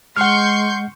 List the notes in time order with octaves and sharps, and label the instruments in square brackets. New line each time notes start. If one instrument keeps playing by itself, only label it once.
[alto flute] G#3 [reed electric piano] F#5 F6 [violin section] C6 C#6 G6